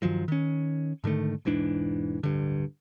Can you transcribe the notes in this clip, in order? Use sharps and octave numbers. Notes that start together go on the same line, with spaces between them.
G2 D#3 F3 F#3
D#3 C#4
G#2 D3 D#3 A3
E1 G#2 E3 D4
D1 G2 D3